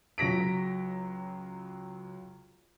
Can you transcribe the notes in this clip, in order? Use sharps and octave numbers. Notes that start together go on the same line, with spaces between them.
C#2 F#3 A#6 B6 D7